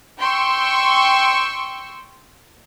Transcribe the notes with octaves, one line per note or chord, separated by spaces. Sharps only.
G5 C6 C#6 E6